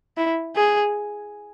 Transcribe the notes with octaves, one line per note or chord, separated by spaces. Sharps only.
E4
G#4